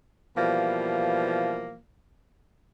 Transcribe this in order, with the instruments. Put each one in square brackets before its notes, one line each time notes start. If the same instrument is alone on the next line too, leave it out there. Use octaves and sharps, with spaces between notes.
[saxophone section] B2 E3 F3 G3 A#3